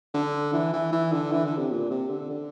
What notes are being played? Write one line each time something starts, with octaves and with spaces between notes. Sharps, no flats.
D3
E3
E3
E3
D3
E3
D3
C3
A#2
C3
D3
D3